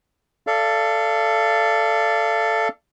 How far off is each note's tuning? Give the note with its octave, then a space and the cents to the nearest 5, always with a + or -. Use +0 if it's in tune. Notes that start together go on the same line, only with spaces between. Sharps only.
A4 +5 D5 +0 F5 -30